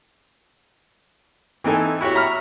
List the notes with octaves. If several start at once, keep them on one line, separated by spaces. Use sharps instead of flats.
E3 C4 D#4 A4 G#5
E4 F#4 G4 C#5
E5 A#5 B5 C#6 F6